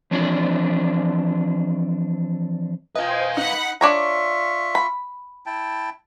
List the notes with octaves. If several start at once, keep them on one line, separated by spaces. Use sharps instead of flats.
E3 F3 C4 D4 C#5 D5
F4 B4 C5 D#5 F5 G5 G#5
D#4 F#5 B5
D4 F4 C#5 E5 A#5 C#6
B5
E4 G5 A5